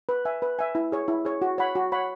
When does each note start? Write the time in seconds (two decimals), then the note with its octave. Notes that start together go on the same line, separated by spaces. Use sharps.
0.09 B4
0.25 E5 G#5
0.42 B4
0.59 E5 G#5
0.75 E4
0.92 G#4 C#5
1.08 E4
1.25 G#4 C#5
1.42 F#4
1.58 C#5 F#5 B5
1.75 F#4
1.92 C#5 F#5 B5